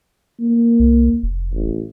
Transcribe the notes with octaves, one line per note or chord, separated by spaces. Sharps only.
A#3
C2
F1
A1